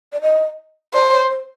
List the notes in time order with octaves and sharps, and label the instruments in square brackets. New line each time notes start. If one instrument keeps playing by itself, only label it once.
[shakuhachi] D5
D#5
[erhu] C5 [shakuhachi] D5
[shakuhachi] C#5
C5